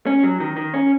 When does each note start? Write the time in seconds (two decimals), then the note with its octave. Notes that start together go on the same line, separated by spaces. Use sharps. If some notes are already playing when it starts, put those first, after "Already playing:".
0.07 C#4
0.23 F#3
0.40 D#3
0.57 D#3
0.74 C#4